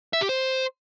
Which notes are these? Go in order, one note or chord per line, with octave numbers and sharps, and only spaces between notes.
E5
G4
C5